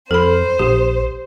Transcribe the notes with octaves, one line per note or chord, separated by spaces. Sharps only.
F2 A4 C5 B5
A#1 G4